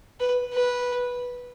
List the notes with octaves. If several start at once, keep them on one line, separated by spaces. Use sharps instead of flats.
B4
B4